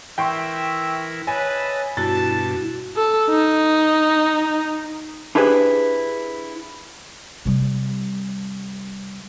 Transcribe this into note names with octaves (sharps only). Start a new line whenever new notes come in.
E3 E4 A#4 E5 G5 C6 C#6
B4 C#5 D#5 E5 G#5 A5
G2 B2 E4 F#4 A5 A6
A4
D#4
D4 E4 G4 G#4 B4 C5
C3 G3